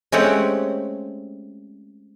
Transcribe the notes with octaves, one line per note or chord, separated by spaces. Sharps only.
G#3 A3 C4 C#4 G4 F#5